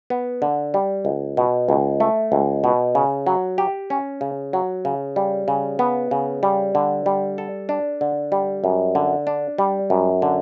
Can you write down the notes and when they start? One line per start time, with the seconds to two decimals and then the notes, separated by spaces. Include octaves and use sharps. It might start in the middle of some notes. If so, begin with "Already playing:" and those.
0.10 B3
0.42 D3
0.74 G3
1.05 C#2
1.37 B2
1.69 C#2
2.00 A3
2.32 C#2
2.64 B2
2.95 C#3
3.27 F#3
3.58 G4
3.90 C#4
4.21 C#3
4.53 F#3
4.85 C#3
5.16 G3
5.48 C#3
5.79 B3
6.11 C#3
6.43 G3
6.75 D3
7.06 G3
7.38 A4
7.69 D4
8.01 D3
8.32 G3
8.64 F#2
8.95 D3
9.27 D4
9.58 G3
9.90 F#2
10.22 D3